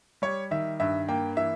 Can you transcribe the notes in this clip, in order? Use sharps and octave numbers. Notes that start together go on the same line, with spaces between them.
G3 C#5
D#3 E5
G2 E5
A#3 G5
E3 E5